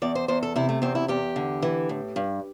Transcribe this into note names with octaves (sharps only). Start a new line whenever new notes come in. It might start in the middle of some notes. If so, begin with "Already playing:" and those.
E2 D5
C5
E2 C5
A4
C3 E4
A3
E2 C4
E4
E2 G4
D3
E3
A2
G2